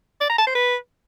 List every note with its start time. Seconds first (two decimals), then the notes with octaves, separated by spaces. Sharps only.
0.21 D5
0.29 A#5
0.38 A5
0.47 C5
0.55 B4